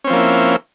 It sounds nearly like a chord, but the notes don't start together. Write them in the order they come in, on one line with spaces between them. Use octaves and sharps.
C#4 C4 F3 A#3 E4